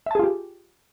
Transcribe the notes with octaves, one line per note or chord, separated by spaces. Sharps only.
F4 G4 G#4 E5 A5